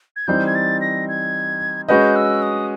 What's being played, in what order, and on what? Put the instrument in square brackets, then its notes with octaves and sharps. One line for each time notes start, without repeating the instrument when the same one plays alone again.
[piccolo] G#6
[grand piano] E3 G3 C4 D#4 [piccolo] G6
[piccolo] G#6
A6
A#6
G#6
[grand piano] G#3 C#4 F#4 B4 D#5 [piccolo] G6
[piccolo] E6
D#6